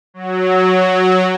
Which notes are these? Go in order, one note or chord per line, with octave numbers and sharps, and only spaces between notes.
F#3